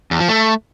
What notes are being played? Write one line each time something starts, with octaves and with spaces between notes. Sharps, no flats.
E2
F3
A3